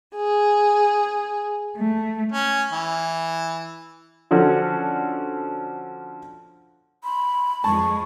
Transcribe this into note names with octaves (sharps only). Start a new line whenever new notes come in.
G#4
A3
C#4
E3
D3 F3 C#4 F#4 A4
B5 C6
F2 G#3 A5 C#6